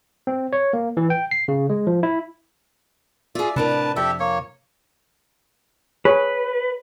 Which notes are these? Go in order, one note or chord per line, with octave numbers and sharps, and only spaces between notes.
C4
C#5
A#3
E3
G5
C7
C#3
G#3
F3
E4
F4 G#4 D5 E5
A2 C3 D4 A#4 B4 A5
F2 G4 A4 E5
A#3 C#5
G#4 B4 C#5